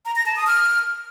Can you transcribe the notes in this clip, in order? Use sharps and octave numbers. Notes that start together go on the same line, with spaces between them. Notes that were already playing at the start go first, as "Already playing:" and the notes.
A#5
A#6
A5
D#6
F6